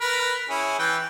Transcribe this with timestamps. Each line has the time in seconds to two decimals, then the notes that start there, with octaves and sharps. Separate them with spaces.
0.01 A#4 B4 B5
0.50 C#4 E4 G#4
0.79 E3 B4 G5